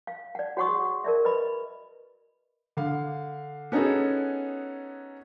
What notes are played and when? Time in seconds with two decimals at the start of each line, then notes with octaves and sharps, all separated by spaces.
0.07 F5
0.35 D5 F#5
0.57 F#4 C#5 F#5 C6 C#6 D#6
0.69 G#4
1.04 A#4 D5 E5
1.25 B4 D#5 B5
2.77 D3 F5
3.72 B3 C#4 D#4 F#4 G#4 A4